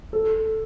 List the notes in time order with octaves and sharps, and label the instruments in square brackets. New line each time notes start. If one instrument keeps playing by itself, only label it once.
[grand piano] A4